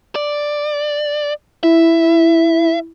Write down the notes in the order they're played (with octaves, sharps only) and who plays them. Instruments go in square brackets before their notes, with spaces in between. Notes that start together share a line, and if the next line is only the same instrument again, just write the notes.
[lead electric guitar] D5
[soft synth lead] E4 [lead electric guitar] E5